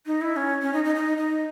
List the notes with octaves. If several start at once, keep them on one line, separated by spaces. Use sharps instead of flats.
D#4
E4
C#4
C#4
D#4
D#4
D#4
D#4